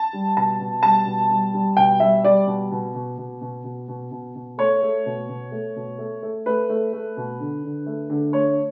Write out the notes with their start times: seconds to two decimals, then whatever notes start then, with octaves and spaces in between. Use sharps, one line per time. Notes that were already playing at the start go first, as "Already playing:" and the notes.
Already playing: A5
0.13 G3
0.37 B2 A5
0.60 B2
0.83 G3 A5
1.06 B2
1.30 G3
1.53 G3
1.77 B2 G5
2.00 G3 E5
2.24 G3 D5
2.47 B2
2.71 B2
2.95 B2
3.18 B2
3.41 B2
3.64 B2
3.88 B2
4.11 B2
4.35 B2
4.58 A3 C#5
4.82 A3
5.06 B2
5.29 B2
5.52 A3
5.76 B2
5.99 A3
6.23 A3
6.46 A3 B4
6.69 A3
6.93 A3
7.17 B2
7.40 D3
7.64 D3
7.86 A3
8.10 D3
8.33 A3 C#5